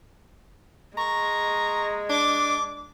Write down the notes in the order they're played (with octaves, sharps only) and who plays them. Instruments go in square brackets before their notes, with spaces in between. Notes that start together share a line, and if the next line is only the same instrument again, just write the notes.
[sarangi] G#3 [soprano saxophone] A#5 [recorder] C#6
[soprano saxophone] D4 [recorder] D6